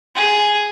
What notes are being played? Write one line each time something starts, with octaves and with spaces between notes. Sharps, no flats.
G#4